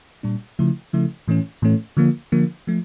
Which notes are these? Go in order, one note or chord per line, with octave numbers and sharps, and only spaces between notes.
A#2 G3 D4
C#3 F3 A3 E4
C#3 F3 A3 E4
A2 E3 A3 C#4
A2 E3 A3 C#4
D3 F3 A#3
D3 F3 A#3
F3 A3